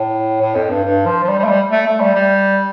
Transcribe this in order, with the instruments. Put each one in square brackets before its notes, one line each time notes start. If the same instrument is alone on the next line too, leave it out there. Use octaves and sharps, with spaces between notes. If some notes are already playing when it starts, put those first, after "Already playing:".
Already playing: [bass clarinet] A2
A2
F2
G2
G2
F3
F3
G3
G3
A3
G3
A3
A3
G3
G3